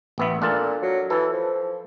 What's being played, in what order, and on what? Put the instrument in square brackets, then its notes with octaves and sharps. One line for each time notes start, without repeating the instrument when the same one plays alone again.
[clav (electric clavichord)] A1 B3 E5
[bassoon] A#2 [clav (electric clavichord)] D4 F4 A4
[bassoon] F#3
[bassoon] E3 [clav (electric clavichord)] A4
[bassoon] F3